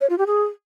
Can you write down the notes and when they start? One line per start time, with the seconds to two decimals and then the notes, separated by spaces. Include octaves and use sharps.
0.01 C#5
0.10 F4
0.18 G4
0.27 G#4